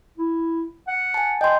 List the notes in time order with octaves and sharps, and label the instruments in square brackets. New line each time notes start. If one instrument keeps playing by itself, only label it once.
[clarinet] E4
F#5
[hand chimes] G#5 A5
[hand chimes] D#5 C6 [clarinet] G5